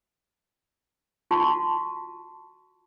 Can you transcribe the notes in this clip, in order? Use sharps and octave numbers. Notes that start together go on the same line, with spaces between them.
F4 F#4 A5 C#6